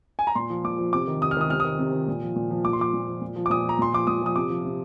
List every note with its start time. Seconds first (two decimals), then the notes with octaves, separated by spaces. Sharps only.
0.19 G#5
0.27 A#5
0.35 A#2 C6
0.50 F3
0.64 A#2 D6
0.78 F3
0.93 C3 D6
1.08 D#3
1.22 C3 D#6
1.31 F6
1.37 D#3 D#6
1.50 C3 F6
1.60 D#6
1.65 D#3
1.79 C3
1.93 D#3
2.08 A#2
2.22 F3
2.36 A#2
2.50 F3
2.65 A#2 D6
2.73 C6
2.79 F3 D6
2.93 A#2
3.07 F3
3.21 A#2
3.36 F3
3.46 D6
3.50 A#2 D#6
3.64 F3 A#5
3.79 A#2 C6
3.93 F3 D6
4.07 A#2 D#6
4.22 F3 D#6
4.36 C3 D6
4.50 F3
4.65 C3